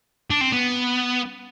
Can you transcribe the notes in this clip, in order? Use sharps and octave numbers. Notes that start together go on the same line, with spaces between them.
D4
C4
B3